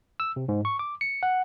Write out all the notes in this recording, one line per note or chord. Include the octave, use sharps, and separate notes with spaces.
E6
C3
G#2
C#6
D6
C#7
F#5